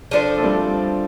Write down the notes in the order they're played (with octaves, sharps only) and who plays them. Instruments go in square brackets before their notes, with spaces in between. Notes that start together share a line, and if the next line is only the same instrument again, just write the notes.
[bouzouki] F3 D4 A4 C5
[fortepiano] A3
G3 C4